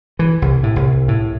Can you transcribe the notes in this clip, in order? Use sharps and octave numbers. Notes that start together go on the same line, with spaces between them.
E3
C2
A2
C2
A2